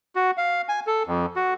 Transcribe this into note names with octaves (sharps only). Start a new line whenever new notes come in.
F#4
F5
G#5
A4
F2
F#4